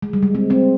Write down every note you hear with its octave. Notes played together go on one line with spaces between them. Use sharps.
G#3
G3
G#3
G#3 C4
G#3 C4